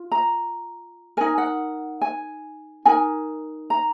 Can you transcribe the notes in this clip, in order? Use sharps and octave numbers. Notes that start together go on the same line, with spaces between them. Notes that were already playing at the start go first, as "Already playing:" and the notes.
Already playing: F4
A#5
D#4 A#4 G#5
F#5
G#5
D#4 A#4 G#5
A#5